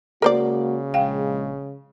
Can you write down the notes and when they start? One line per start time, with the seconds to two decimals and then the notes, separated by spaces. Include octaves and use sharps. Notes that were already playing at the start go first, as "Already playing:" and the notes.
0.22 C#3 G#3 A#3 F#4 A#4 C5 D5
0.94 A#1 G#3 F5 G5